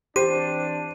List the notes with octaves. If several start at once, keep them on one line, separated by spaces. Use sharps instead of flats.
E3 C4 D4 G4 C5 D#7